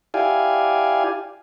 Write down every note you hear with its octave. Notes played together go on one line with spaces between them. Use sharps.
E4 G4 D5 F5 G#5